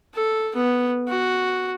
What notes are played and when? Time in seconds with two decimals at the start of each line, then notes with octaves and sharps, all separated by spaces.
0.14 A4
0.55 B3
1.08 F#4